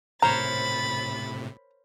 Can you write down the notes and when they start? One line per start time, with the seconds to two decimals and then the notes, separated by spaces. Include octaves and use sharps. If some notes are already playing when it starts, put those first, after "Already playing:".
0.22 A2 C3 A#4 C5 C#5 A#5 B5 A6